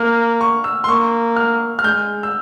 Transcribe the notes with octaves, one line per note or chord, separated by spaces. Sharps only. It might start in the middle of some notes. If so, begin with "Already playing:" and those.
Already playing: A#3 F6
C#6
E6
C6
A#3 C#6
F6
F6
G#3 G6
E6